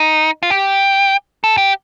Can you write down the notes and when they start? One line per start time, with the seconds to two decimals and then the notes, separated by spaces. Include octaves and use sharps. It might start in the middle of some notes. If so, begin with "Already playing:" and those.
Already playing: D#4
0.43 F4
0.50 G4
1.44 A4
1.57 G4